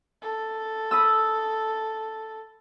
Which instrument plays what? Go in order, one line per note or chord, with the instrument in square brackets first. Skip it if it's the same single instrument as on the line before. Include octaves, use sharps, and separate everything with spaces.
[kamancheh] A4
[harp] B5 D#6 E6